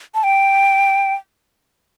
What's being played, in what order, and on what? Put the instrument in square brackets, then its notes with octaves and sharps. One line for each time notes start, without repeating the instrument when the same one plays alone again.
[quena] A5
G5